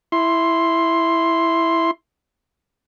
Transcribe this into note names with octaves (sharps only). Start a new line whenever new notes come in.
E4 C6